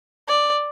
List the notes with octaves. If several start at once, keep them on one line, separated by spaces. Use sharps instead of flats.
D5